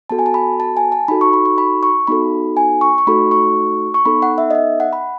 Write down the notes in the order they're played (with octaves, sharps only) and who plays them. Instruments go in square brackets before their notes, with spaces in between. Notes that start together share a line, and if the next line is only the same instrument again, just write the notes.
[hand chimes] B3 F#4 A4 A5
G#5
A5
B5
A5
G#5
A5
D#4 F#4 A4 B5
C#6
B5
C#6
B5
C#6
B3 D#4 F#4 A4 B5
G#5
C#6
C#6
A3 D#4 F#4 A4 B5
C#6
C#6
B3 D#4 A4 B5
F#5
E5
D#5
E5
F#5
B5